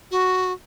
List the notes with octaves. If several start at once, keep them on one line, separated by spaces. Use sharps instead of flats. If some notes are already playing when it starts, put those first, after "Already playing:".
F#4